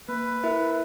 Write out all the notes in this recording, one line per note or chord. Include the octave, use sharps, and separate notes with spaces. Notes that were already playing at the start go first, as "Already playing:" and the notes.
A#3 B4
E4 A#4 E5